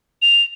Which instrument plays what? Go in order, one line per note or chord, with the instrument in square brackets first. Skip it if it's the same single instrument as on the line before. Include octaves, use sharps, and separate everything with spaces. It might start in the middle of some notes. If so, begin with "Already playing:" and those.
[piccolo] F7